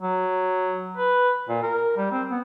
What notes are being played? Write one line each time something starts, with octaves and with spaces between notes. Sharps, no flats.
F#3
B4
A#2
A#4
G3
C4
B3